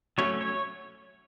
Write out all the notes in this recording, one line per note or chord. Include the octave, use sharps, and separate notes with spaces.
F#3 A3 C#4 C#5
C#5